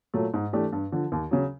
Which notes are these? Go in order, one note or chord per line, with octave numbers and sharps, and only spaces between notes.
A#2 F#3 A3
G#2
E3 A3 D4 G4
G2
D3 F3
D#2
C#3 F#3